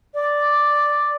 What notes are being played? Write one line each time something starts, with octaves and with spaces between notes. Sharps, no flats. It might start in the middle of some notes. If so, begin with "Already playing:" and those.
D5